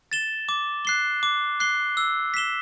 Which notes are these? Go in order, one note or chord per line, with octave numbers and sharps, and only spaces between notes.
A6 E7 G7
D6
F#6 C7 G7
D6
F#6 C7 G7
E6
B6 E7 G7